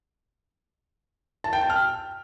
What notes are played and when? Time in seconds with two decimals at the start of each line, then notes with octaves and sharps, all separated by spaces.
1.44 A5
1.53 G5
1.61 A5
1.70 F6